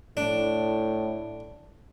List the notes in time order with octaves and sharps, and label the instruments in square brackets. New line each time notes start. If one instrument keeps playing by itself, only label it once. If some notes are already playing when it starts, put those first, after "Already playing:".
[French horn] A2 [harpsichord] D4